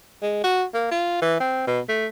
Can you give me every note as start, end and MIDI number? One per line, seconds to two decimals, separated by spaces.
0.22 0.39 56
0.44 0.64 66
0.74 0.87 58
0.91 1.17 65
1.22 1.40 52
1.40 1.67 60
1.67 1.80 47
1.89 2.07 57